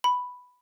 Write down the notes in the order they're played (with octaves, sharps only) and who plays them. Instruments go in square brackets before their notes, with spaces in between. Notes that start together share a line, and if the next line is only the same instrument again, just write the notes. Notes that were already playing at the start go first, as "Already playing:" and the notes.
[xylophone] B5